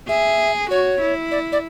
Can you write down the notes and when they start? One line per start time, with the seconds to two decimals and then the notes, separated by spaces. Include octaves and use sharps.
0.09 G#4 E5
0.70 F#4 C#5
1.01 E4
1.31 D5
1.52 D5